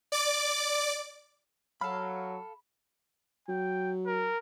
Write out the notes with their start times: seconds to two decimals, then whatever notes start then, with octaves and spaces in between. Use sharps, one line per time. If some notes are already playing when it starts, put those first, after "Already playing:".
0.12 D5 D6
1.81 F#3 A4 F5 B5
3.49 F#3 G5
4.07 A#4